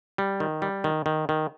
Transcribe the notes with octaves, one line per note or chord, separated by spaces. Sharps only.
G3
D#3
G3
D#3
D#3
D#3